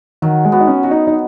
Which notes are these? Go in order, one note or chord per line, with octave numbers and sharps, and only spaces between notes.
D#3 F#3
G#3
B3 F#4
D#4
C#4
D#3 F#4
D#4
D#4